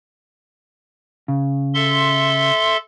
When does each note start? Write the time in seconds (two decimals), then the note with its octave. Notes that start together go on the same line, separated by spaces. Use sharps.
1.28 C#3
1.74 A4 E5 C6